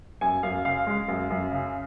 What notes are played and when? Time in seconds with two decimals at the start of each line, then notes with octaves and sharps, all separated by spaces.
0.21 F#2 G#5
0.43 F#2 F5
0.65 C#3 F5
0.87 G#3
1.08 F#2
1.30 F#2
1.51 C#3